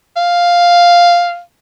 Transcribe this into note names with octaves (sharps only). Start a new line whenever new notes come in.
F5